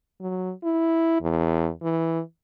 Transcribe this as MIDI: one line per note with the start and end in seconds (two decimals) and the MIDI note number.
0.21 0.52 54
0.64 1.20 64
1.22 1.70 40
1.82 2.20 52